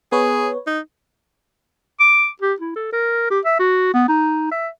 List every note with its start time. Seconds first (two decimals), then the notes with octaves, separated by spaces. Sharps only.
0.12 B3 G#4 B4 C#5
0.67 D#4
2.00 D6
2.41 G4
2.60 E4
2.76 A4
2.92 A#4
3.30 G4
3.45 E5
3.59 F#4
3.94 B3
4.08 D#4
4.51 E5